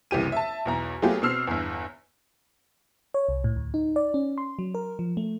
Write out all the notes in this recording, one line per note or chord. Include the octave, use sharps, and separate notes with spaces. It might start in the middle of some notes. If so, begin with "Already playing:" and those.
F#1 C2 E3 G4 D#7
E5 A5
B1 E2 A#5
F#3 A3 B3 F4 G4 G#4
B2 C4 E6 F6 C7
G1 E2
C#5
C2
A2
D2
D#4
D5
C#4
C6
F#3
A#4
F3
A3